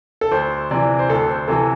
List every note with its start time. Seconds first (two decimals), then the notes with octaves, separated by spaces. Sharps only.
0.21 A4
0.32 D2 C5
0.71 C3 E3 D5
0.99 C5
1.09 D2 A4
1.29 C5
1.48 C3 E3 A4